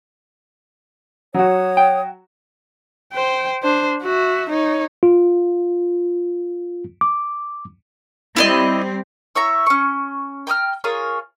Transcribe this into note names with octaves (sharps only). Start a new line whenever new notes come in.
F#3 F#4 C#5 D#6
G5
C5 G5
D4 C5
F#4 E5
D#4 C#5
F4
D6
G3 C4 E4 D5 D#5
E4 C#5 E5 A#5
C#4 C#6
G5 A#5 D#6 F6
F4 G#4 A#4 C#5